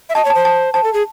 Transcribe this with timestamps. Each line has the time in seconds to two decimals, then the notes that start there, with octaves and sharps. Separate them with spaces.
0.09 E5
0.15 D#5 A5
0.25 C#5
0.30 C5 A5
0.45 A5
0.74 C5 A5
0.84 A4
0.94 G#4